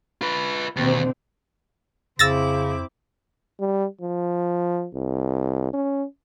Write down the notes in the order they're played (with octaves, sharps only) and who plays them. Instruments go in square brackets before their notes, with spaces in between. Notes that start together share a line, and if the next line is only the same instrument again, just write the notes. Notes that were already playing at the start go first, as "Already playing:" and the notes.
[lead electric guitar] F4 B4
[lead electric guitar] D#2 [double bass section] B2 D3 C4
[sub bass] F2 [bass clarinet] C#3 [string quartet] C4 E4 D6 [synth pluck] E6 A6 A#6
[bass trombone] G3
F3
C2
C#4